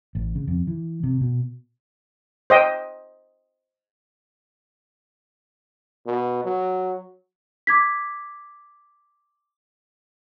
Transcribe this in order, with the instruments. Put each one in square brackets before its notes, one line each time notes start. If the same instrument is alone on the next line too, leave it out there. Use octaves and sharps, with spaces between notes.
[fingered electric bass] A1
C#3
F2
E3
C3
B2
[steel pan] C5 D#5 G5
[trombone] B2
F#3
[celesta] D6 G#6 B6